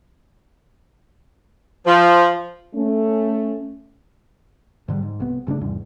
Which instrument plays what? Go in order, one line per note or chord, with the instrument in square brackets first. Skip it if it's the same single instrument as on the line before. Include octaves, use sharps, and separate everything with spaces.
[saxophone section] F3
[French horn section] A3 C#4
[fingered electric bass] G#2 D3 D#3 G3
G#2
C2 B3
G1 C#3 A3 D4
E2 G#2 C3 G3